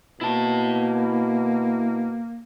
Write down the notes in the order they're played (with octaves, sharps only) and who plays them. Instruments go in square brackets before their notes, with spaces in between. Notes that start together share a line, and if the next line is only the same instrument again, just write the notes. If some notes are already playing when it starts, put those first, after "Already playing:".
[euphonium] B2 [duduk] A#3 [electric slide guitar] E4 A5